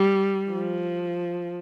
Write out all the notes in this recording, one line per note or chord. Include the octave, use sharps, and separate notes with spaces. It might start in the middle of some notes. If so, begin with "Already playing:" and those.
Already playing: G3
F3